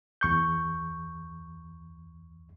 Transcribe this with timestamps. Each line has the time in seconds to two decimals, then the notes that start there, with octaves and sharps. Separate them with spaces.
0.21 E2 C#6 G6